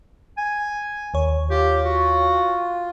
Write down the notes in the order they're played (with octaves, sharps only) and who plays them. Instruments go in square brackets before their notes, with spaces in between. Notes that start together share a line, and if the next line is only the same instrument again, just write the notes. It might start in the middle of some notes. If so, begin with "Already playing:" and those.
[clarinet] G#5
[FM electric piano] D#2 C#5
[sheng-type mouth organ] F4 [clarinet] G4
[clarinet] F#4